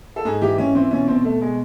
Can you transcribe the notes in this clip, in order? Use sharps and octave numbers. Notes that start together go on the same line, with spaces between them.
A4
G#2 G#4
E3 G4
E3 C#4
E3 C4
B2 C#4
B2 C4
B2 A3
B2 G#3